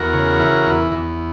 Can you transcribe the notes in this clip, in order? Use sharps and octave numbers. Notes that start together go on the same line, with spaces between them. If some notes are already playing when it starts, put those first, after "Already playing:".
Already playing: E2 F#4 A#4
C#3
E3
E2
E2